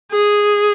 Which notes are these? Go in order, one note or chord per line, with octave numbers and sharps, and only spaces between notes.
G#4